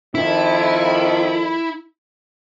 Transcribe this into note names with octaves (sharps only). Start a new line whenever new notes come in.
F2 D#3 E4